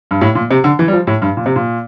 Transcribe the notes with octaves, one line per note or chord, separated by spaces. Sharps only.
G2
A2
A#2
C3
D3
E3
G3
F3
A2
G2
A#2
C3
A#2